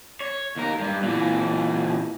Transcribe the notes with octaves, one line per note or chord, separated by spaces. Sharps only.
C#5
D#2 A#4
G2
A#2 E3